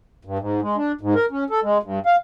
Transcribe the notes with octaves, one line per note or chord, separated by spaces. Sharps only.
G2
G#2
G#3
D4
G#2
A#4
C#4
A4
G#3
G2
F5